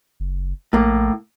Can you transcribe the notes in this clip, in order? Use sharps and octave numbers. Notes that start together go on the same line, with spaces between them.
F#1
A#1 A2 A#3